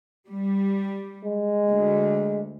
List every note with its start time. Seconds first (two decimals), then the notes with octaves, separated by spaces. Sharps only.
0.29 G3
1.24 G#3
1.68 D2